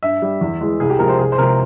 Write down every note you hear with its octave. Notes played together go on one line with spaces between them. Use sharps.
G2 E5
G3
E2
E3 G#3
C2 G#4
G4
C3 F3 G#3 A#4
C5
C2 G#4
C5
C3 F3 G#3 A#4